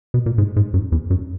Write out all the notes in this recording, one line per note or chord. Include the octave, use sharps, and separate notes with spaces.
B2
A#2
G#2
G#2
F#2
E2
F#2